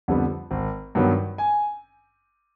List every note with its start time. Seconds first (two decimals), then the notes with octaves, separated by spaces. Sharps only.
0.08 F2 D3 G3 B3
0.51 G#1
0.95 G2 D#3 F#3 B3
1.38 G#5